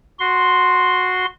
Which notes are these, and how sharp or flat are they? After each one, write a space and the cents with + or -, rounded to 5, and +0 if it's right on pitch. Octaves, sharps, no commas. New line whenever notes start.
F#4 -10 C6 +0